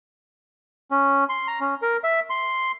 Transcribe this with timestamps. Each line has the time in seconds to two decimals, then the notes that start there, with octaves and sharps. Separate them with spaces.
0.91 C#4
1.29 C6
1.48 A#5
1.61 C#4
1.82 A#4
2.04 E5
2.30 C6